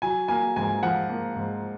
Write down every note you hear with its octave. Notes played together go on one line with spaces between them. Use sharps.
F#3 G#5
A#3 G#5
G#2 G#5
F3 F#5
A#3
G#2